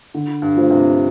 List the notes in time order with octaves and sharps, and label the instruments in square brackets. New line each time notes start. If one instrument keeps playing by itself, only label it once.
[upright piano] D3
[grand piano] G2
[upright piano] F3 A3 F4 C5
[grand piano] G2 C3